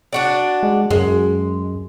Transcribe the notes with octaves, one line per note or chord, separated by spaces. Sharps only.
D4 F#4 D5
G#3
F#2 G#3